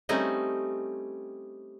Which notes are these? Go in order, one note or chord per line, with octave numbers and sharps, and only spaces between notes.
G3 A3 C4 C#4 D#4